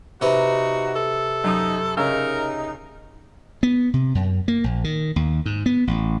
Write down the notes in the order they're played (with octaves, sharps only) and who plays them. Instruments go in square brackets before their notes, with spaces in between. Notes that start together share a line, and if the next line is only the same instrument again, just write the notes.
[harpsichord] C3 B4 [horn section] D#4 F#4
[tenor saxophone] A4
[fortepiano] F#2 D#6 [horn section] D#4
[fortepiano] C#3 C#4 E6 [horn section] D#4 [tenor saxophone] A#4
[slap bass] B3
C3
F#2
A#3
A#1
D#3
D#2
G#2
B3
A1